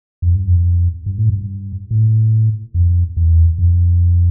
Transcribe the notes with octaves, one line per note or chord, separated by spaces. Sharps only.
F2
G2
F2
G2
A2
G2
A2
F2
E2
F2